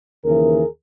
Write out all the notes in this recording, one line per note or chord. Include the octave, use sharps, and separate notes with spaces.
D#2 C#3 E3 G#4 A#4